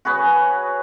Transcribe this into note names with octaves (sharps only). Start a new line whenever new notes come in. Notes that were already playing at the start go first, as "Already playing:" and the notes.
F#4 G#4 B4 C#5